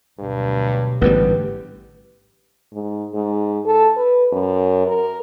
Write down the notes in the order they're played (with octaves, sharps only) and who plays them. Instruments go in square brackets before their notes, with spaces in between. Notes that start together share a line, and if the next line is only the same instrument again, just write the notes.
[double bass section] D2 B2 F#3 [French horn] G2
[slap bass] A1 G#2 G3 [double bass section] D3 [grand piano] B3 [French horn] G4
[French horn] G#2
G#2
A4
B4
F#2
A#4